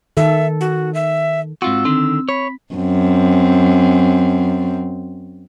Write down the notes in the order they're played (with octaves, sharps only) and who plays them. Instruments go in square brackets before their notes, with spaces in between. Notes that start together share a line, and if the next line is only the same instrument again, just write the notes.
[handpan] D#3 A4 [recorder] E5
[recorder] F#4
E5
[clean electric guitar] G#2 F4 F#4 [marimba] C4 [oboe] E6
[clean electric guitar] D3 D#3 [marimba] C4
[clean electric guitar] C#5 [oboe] B5
[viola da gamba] F#2 C4